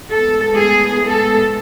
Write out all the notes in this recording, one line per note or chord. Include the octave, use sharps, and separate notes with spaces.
A2 G#3 B3 A4
G#4
A4